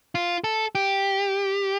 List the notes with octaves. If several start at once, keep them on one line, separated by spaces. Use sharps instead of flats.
F4
A4
G4